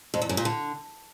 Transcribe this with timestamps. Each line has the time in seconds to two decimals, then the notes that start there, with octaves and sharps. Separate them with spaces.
0.14 F2
0.22 E2
0.29 F#2
0.37 A#2
0.45 D3